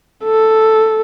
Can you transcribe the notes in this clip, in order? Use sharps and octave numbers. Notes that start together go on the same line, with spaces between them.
A4